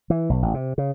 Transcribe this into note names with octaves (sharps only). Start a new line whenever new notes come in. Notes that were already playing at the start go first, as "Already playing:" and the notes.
E3
B1
A1
C3
C#3